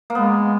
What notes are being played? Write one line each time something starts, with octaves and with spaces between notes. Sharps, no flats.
A#3
G#3 B3